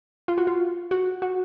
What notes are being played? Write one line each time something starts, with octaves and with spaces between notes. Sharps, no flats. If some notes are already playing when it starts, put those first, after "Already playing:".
F4
F#4
F4
F#4
F#4